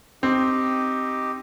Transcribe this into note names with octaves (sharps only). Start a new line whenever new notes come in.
C4 D#4 G4